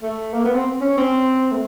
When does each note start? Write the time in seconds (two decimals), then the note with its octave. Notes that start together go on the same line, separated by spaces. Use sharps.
0.02 A3
0.33 A#3
0.44 B3
0.54 C4
0.81 C#4
0.97 C4
1.51 A3